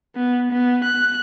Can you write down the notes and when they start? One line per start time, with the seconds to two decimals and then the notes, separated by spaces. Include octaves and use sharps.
0.16 B3
0.52 B3
0.84 F#6